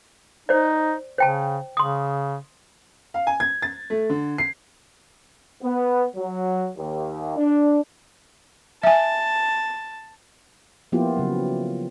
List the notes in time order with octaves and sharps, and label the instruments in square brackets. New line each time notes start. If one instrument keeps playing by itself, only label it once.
[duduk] D#4 [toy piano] C5 D5
[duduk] C#3 [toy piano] C5 G5 A5
[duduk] C#3 [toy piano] C6 D#6
[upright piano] F5
G#5
G#6
A6
A3
D3
C7
[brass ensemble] B3
F#3
D#2
D4
[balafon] E5 G#5 [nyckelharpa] A5
[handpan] F3 A#3 B3 E4 F4 G4
C#3 F#3